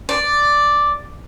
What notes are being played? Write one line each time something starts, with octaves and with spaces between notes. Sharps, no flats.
D5